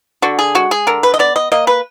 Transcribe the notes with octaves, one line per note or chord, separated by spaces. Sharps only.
D3 F#4
G#4
G#3 F#4
G#4
D3 A#4
B4
D#5
B3 D5
D#5
A#3 D#5
B4